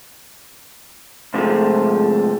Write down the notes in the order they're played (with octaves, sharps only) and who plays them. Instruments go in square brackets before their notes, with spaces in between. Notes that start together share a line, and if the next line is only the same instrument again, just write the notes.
[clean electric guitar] G#2 C3 F3 F#3 G#3 A3